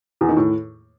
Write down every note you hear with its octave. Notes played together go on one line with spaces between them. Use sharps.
E2
D#3
A2